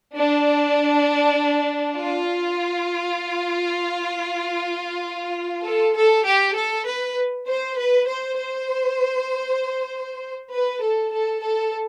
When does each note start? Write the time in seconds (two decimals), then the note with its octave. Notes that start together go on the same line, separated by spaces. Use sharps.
0.16 D4
1.99 F4
5.64 A4
5.95 A4
6.25 G4
6.55 A4
6.86 B4
7.47 C5
7.77 B4
8.07 C5
8.38 C5
10.51 B4
10.81 A4
11.12 A4
11.42 A4